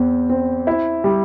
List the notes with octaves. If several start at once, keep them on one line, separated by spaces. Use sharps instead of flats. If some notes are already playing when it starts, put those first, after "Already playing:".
Already playing: E2 C4
C4
E4
G3